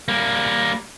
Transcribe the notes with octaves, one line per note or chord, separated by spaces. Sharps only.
G3 A#3